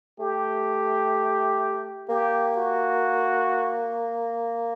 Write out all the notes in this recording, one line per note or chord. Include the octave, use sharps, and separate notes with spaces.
A3 G4
A#3 G4
F#4